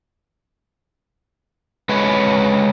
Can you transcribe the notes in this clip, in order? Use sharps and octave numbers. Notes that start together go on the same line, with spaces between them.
G#3 B4 C#5